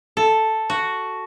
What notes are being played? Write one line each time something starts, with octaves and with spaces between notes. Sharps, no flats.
A4
F#4